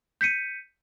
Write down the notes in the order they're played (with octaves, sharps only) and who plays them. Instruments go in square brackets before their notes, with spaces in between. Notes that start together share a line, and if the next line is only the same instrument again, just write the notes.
[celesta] G6 B6 C#7 D#7